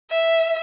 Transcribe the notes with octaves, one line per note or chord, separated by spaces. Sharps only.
E5